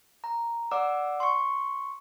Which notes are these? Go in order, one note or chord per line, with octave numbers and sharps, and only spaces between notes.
A#5
D5 F#5 D6 E6
C6 C#6